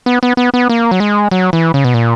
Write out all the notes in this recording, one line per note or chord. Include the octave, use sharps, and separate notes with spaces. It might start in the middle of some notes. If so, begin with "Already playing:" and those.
B3
B3
B3
B3
A#3
F#3
G#3
F#3
E3
C#3
B2
A#2